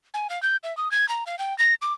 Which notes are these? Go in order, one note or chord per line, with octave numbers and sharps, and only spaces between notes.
G#5
F5
G6
E5
D#6
G#6
A#5
F5
G5
A#6
D6